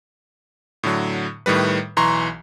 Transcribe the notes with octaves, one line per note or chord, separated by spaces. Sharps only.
A2 D3 F#3
A2 D#3 G3 B4
B1 E3 A#5 C6 C#6